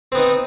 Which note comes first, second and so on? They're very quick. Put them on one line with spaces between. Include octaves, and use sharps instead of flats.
C4 B3 D#4